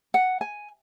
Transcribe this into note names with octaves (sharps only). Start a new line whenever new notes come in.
F#5
G#5